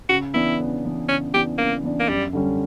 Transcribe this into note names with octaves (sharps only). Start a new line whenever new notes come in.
C#3 F#4
E3 B3 D4 E4
C#3
E3 B3 D4
C#3 C#4
E3 B3 D4 G4
C#3 A#3
E3 B3 D4
A#3
F#2 G3
D3 G3 C#4